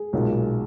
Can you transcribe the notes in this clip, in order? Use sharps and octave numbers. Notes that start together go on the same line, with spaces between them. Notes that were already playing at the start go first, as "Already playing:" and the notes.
Already playing: G#4
B1 A#2 G#3